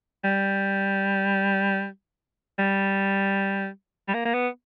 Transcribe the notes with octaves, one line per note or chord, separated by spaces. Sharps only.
G3
G3
G3
A#3
A#3
B3